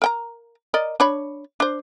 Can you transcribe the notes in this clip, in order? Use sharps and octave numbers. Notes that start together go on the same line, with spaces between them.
A#4 G5 A#5
A#4 D5 D#5
D4 C#5 B5
D4 C5